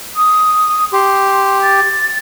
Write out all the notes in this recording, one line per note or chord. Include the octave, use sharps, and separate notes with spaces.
D#6
G4 C6
A6